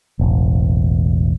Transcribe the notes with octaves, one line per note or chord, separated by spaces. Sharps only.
E1 A1